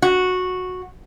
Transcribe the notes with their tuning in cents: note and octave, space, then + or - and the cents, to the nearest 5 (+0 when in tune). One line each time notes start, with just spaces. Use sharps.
F#4 -10